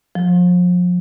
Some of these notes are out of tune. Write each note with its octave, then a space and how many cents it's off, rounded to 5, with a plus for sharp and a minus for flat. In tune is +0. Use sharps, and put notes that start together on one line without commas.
F3 +35